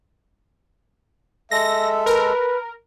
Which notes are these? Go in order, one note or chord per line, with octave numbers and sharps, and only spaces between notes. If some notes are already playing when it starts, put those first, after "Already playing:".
G#3 A4 E5 A#6
A#4 B4